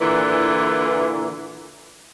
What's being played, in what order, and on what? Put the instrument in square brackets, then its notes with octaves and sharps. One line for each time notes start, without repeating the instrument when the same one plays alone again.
[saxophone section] A#2 D3 E3